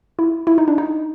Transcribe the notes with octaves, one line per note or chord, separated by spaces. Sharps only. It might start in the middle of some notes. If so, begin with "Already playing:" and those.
E4
E4
D#4
D4
D#4